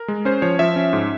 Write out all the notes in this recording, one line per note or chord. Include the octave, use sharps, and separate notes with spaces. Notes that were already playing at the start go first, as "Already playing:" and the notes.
Already playing: A#4
G#3
C#4 C5
F3 C#5
F3 E5
C#4
G#2